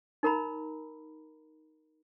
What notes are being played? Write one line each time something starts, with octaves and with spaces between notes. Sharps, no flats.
D#4 A#4 A#5 B5